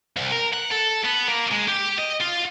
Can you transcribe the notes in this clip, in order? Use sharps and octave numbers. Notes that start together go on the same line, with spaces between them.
C2
A#4
F#5
A4
B3
A#3
G#3
G4
D#5
F4